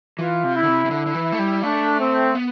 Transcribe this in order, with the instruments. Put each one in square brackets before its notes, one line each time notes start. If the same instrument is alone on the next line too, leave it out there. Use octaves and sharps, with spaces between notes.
[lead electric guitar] E3 [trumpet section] F4
[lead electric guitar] C3
[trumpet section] E4
[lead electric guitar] D3
C3
C3
[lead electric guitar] D3 [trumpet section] E4
[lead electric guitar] D3
E3
A3
G3
[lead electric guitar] A3 [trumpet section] D4
[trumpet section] C4
[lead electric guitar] B3